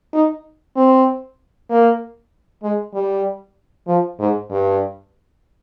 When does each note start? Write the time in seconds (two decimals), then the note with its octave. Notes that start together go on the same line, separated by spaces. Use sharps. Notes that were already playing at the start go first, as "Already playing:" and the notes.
0.14 D#4
0.76 C4
1.70 A#3
2.63 G#3
2.94 G3
3.88 F3
4.19 G#2
4.51 G2